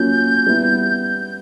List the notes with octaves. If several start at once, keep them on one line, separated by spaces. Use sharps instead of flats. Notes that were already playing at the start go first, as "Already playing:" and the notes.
Already playing: F#3 A#3 C#4 F4 G6
G3 B3 E4